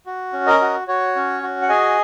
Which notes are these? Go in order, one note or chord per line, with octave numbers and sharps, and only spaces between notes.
F#4
C#4
A#4 D#5
F#4
F#4 C#5
C#4
F#4
F#5
G#4 D#5 G#5